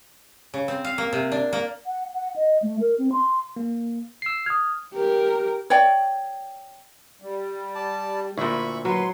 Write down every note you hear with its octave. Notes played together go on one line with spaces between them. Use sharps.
C#3
C4
F5
A#3
C3
D4
A#3
F#5
F#5
D#5
A3
A#4
C4
C6
A#3
E6 C7
D#6 F6 G#6
G4 A#4
C#5 D5 G5
G3
D5 A5
D2 A#2 E4 E5 B5 C#6
F#3 B4 C6